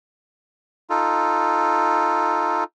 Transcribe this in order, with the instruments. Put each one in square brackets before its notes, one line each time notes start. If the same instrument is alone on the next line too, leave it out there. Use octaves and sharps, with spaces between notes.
[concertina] D#4 F4 A4